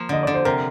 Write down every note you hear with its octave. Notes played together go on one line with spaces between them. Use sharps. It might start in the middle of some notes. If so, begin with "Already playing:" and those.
Already playing: F3 A#3
D3 D#5
D3 D5
C5
C3 A#4